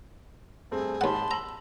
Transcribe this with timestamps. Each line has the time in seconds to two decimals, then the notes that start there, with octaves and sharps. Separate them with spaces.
0.71 G2 A3 C4 G#4
1.01 D#2 G#2 F#5 A5 B5 C6
1.31 A#5 E6 F#7